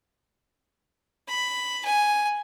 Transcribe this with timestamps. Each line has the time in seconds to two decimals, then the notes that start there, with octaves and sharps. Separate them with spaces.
1.28 B5
1.85 G#5